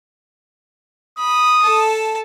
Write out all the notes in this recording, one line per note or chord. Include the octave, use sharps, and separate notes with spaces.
B5 D#6
A4 A5